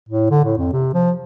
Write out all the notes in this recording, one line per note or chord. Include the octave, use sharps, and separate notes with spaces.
A2
D3
A2
F2
C3
F3